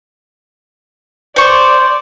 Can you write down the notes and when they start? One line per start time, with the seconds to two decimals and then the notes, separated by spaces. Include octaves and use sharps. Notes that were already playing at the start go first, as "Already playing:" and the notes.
1.36 C5 D5 C#6